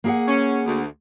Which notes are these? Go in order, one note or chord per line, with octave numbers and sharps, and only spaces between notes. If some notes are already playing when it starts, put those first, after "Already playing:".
A#3 G#4 F#5
C#4
D2